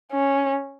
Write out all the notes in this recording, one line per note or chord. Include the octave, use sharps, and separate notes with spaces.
C#4